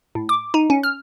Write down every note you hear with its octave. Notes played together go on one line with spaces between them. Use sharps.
A2
D6
D#4
C#4
F6